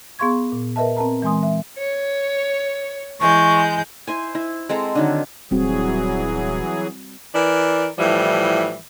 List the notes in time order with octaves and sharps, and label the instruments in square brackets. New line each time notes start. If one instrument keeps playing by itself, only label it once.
[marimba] B3 G#4 F5 C6 C#6 G#6
A#2
A#4 B4 D#5 E5 A5
C4 A#4 A5 A#5
E3 G#3 G#5 C6 D#6
E5
[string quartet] C#5
[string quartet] E3 G#3 G6 [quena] C#6
[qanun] E4 C5 G#5
E4
G#3 C4 A4 A#5
D3 D#3 F#3
[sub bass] D#1 [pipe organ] E3 F#3 G#4 [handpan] G3 C4 F#4
[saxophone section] E3 A#4 D5
A2 E3 F3 G3